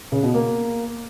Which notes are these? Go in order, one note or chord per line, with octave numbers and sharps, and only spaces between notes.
C#3
B2
A#3